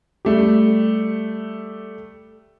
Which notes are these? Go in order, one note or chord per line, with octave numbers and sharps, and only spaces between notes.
G3 A3 G4